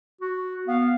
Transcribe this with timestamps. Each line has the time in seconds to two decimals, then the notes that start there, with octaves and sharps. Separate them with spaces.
0.21 F#4
0.67 B3 F5